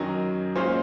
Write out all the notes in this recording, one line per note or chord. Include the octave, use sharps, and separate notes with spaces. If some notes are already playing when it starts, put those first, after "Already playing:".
Already playing: F#2 D#3 F#3 D#5
A#2 G#3 C#4 F4 C5